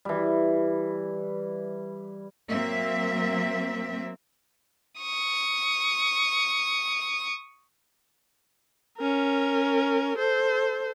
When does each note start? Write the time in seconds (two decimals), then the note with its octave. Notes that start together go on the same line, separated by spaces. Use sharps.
0.05 E3 G3
2.50 F#3 A#3 C4 E5
5.01 C#6 D#6
8.98 C#4 A#4
10.18 A4 C5